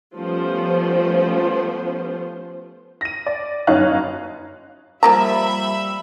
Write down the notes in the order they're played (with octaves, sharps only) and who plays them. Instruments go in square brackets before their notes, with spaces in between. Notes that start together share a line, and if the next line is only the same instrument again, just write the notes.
[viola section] F3 G3 A3 B3 C#4 C5
[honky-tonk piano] A#6 D#7
D5
G1 F#2 D#4 C#5 F5 F#6
[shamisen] F3 A#3 A#5 [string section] G3 E5 B5